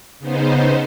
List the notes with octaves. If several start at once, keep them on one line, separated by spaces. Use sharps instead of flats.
C#3 B3 D#4 C5